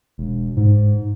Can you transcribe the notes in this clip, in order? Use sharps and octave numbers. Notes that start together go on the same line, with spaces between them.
E1
G#2